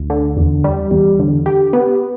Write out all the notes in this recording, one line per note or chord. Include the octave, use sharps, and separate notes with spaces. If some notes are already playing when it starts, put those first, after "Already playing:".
Already playing: D2
D3
E2
G3
E2
D3
G4
B3